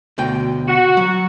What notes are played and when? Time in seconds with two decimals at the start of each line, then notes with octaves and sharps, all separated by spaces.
0.18 D2 B2 G5
0.67 F#4
0.97 F#3